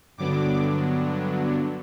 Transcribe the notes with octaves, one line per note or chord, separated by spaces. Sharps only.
G2 D3 F#3 B3 D4 D6